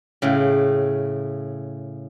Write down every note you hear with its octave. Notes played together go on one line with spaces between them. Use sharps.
A2 C#3